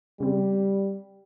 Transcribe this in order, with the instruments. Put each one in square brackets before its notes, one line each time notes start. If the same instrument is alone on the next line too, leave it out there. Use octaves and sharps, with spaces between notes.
[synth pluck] C#3 C4 [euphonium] G3